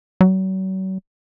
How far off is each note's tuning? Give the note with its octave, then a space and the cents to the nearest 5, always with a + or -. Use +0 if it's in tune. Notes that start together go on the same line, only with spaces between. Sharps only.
F#3 +40